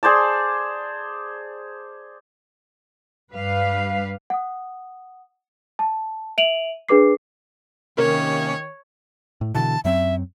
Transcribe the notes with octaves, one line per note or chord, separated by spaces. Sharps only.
G#4 C5 D5 A5
G2 G3 B4 F5
F#5 D#6
A5
E5 D7 D#7 F7 F#7
D4 G#4 B4 D6 C7
C3 D#3 A#3 C#4 A#4 C#5
A2
B2 D3 E3 A5
F#2 F#3 C4 E5